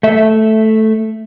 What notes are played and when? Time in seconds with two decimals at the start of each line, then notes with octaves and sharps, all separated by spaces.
0.03 A3 E5